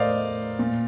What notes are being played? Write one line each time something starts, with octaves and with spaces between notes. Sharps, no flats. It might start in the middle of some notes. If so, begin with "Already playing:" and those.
Already playing: A2 A#4 C5 D5 D#5 F5
A#2